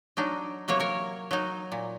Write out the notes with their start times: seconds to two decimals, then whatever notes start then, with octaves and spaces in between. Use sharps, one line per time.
0.17 F#3 D4 D#4
0.68 C3 F#3 A#3 C#5
0.80 A#4 C#5
1.31 F#3 D#4
1.72 A#2